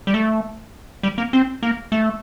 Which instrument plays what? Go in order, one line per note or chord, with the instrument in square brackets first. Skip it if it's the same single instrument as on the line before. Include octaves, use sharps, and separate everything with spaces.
[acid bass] G3
A3
G3
A#3
C4
A#3
A3